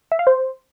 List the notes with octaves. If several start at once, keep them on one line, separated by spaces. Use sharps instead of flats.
E5
F5
C5